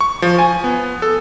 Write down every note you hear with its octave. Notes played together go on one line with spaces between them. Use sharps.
C#6
F3
G#5
B3
A4